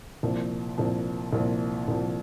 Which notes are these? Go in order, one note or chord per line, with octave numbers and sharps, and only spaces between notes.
C2 A#2 F3
C2 A#2 F3
C2 A#2 F3
C2 A#2 F3